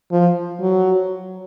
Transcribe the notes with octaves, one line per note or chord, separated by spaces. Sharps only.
F3
F#3